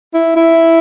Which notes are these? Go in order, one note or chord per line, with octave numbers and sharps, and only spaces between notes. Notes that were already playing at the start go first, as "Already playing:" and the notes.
E4
E4